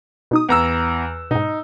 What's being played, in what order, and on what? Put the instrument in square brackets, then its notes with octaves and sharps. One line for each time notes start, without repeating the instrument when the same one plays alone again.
[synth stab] B2 D#4 D#6
[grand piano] E2 A#5 E6
[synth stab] G#2 B2 [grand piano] D#4